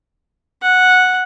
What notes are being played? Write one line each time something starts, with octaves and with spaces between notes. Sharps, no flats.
F#5